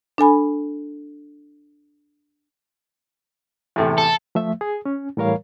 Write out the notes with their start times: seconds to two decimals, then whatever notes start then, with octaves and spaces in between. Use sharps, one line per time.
0.18 D4 A4 G#5 B5
3.76 E2 A2 C3
3.98 A4
4.35 F3 A3 E5
4.61 G#4
4.85 C#4
5.17 A2 E3 G3 A#4 C#5 F5